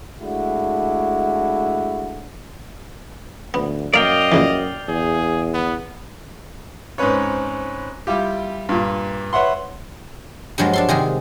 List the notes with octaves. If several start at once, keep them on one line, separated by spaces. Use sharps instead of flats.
G#3 A3 D4 E4 F#4
D2 B3
F#2 A#3 D5 D#5 F5 G5
A#2 C#3 E3
E2 G#4
B3
G#2 C4 C#4 B4 C#5
G3 E4 F4 G4
G2 A#2
B4 C#5 E5 F#5 C6
G2 F3 F#3 G#3 A#3
D4 A4 C6
C3 D#3 G#3 G#4